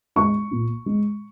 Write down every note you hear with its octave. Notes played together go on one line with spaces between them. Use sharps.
G#3 C#6
A#2
G#3